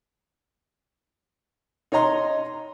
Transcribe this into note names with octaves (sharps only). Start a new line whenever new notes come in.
D#4 C#5 D#5 A#5 C6